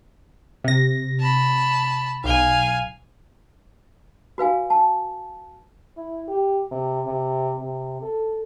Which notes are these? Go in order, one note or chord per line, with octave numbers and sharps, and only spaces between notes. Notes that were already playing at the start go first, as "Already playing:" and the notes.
C3 A#6
A5 B5
B1 F5 G#5
F#4 B4 F5 G#5
A5
E4
G4
C3
C3
C3
A4